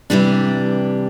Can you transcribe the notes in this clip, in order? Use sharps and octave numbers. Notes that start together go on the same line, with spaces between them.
C3 E3 G3 D4 G4